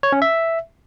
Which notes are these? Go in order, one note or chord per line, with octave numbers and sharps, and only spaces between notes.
C#5
C#4
E5